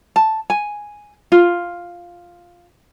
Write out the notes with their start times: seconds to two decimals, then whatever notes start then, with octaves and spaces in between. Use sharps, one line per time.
0.16 A5
0.50 G#5
1.32 F4